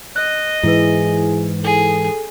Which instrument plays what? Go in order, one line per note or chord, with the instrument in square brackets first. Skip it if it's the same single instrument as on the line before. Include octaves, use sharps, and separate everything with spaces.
[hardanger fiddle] D#5 [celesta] F#6
[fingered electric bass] G#2 E3 [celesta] E4 B4 [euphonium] G#4
[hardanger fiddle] G#4 [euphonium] A4